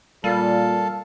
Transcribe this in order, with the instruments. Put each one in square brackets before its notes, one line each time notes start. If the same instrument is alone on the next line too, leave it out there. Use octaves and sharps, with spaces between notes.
[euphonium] A#2 [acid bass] G3 [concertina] A4 F5 A5